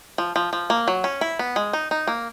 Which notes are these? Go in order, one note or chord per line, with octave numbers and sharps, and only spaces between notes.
F3
F3
F3
A#3
F#3
C#4
E4
B3
G#3
D#4
D#4
A#3